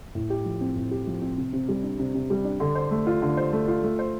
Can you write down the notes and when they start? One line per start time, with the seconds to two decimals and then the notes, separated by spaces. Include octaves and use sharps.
0.15 A2
0.30 G4
0.45 F3
0.61 C4
0.76 A2
0.91 G4
1.07 F3
1.22 C4
1.37 C3
1.53 C3
1.68 G3
1.83 D4
1.99 C3
2.14 C3
2.30 G3
2.45 D4
2.60 D3
2.75 C5
2.91 A3
3.07 F4
3.22 D3
3.37 C5
3.53 A3
3.68 F4
3.83 A3
3.99 C5